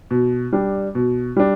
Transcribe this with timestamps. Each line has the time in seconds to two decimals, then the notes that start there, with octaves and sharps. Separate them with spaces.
0.11 B2
0.53 G3 D4
0.95 B2
1.36 G3 D4